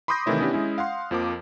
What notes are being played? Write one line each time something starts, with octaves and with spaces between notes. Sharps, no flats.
B5 C6 D6 D#6 G6 A#6
C3 D#3 E3 A3 E4 C#5
B3 C#4 D4 E4 G4
G#3 C#4 E4
F5 F#5 C6
F2 F3 A#3 D6